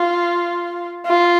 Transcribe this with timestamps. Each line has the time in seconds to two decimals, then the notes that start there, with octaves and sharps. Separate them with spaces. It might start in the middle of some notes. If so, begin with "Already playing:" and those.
Already playing: F4
1.07 F4